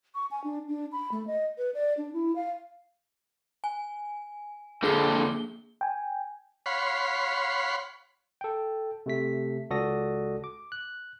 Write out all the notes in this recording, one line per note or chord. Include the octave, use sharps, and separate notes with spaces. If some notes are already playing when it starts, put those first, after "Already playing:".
C#6
G#5
D4
D4
B5
A3
D#5
B4
D5
D4
E4
F5
G#5
F2 D3 A#3 G#4 G7
G5 G#5
C#5 F5 F#5 B5 C6
A4 G5
C3 A3 B6
C#2 F#4 A4 D5 D#6 A#6
D6
F#6